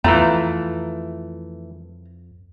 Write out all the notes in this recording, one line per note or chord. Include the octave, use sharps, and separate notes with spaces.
F2 E3 A3 F4 A#5